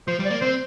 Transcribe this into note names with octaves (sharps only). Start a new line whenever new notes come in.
F3 C5
G3
D5
A#3
C4 C5